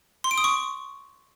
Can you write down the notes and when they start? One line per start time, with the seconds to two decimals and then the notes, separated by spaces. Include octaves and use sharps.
0.24 C6
0.31 D7
0.38 D#6
0.44 C#6